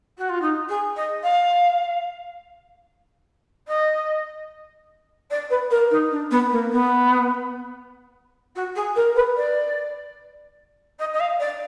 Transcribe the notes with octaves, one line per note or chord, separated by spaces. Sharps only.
F#4
F4
D#4
G#4
D#5
F5
D#5
D5
B4
A#4
D#4
D4
B3
A#3
B3
F#4
G#4
A#4
B4
D5
D#5
D#5
F5
D5